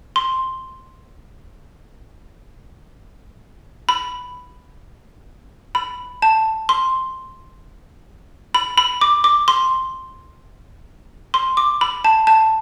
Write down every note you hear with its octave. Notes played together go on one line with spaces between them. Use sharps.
C6
B5
B5
A5
C6
B5
B5
D6
D6
C6
C6
D6
B5
A5
A5